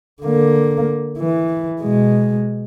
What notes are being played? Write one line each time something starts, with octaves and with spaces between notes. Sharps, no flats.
D3 A#3
E3
B2 G#3